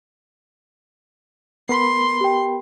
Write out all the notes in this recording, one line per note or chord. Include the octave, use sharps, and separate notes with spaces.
B3 A#4 B5 C6
G4 G5